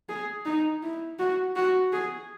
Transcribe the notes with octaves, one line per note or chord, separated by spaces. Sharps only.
G#4
D#4
E4
F#4
F#4
G#4